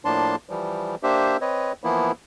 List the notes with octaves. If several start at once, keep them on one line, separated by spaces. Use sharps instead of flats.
A2 F3 A#3 D4 A5 C6
E3 F3 G3
A#3 D4 G4 C5 E5
C4 B4 C#5 D#5
E3 F3 A#3 B3 E4